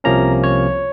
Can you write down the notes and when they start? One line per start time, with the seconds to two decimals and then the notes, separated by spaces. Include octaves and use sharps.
0.04 C2 C3 F3 A#3 C#4 A#5
0.44 C#5